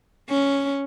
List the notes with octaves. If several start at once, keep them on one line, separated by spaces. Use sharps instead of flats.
C#4